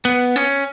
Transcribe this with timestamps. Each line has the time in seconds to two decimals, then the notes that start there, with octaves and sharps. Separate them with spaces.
0.05 B3
0.36 C#4